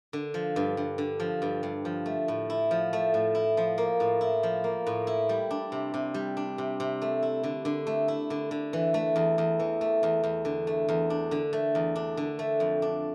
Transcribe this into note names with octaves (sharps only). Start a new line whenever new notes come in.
D3
F3
G2
G2
D3
F3
G2
G2
F3
A3
A2
E4
F3
A3
A2
E4
F3
A#3
A2
E4
F3
A#3
A2
E4
G3
D4
C3
C3
G3
D4
C3
C3
A3
E4
D3
D3
A3
E4
D3
D3
E3
A3
E2
E2
E3
A3
E2
E2
D3
A3
E2
D4
D3
A3
E2
D4
D3
A3
F2
D4